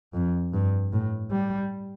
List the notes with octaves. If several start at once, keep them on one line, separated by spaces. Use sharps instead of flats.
F2
G2
A2
G3